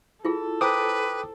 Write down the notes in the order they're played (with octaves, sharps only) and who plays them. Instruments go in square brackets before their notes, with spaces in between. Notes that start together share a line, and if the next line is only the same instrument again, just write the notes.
[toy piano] E4 F4 G#4 [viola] A4
[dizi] B4 [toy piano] C5 A#5 [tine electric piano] G5 D6 D#6